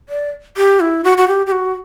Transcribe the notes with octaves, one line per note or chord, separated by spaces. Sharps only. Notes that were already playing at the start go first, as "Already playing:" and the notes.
D5
G4
E4
F#4
F#4
G4
G4
F#4